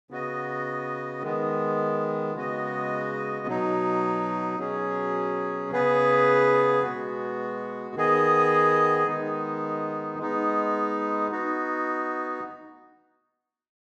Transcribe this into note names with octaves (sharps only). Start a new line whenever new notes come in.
C#3 B3 F#4 D#5
D#3 G#3 B3
C#3 G#3 B3 F#4 D#5
B2 F#3 D#4
B2 F#3 C#4 G#4
C#3 B3 G#4 B4
B2 G#3 B3 F#4
D#3 B3 G#4 D#5
D#3 G#3 B3 D#4
G#3 B3 D#4
B3 D#4 F#4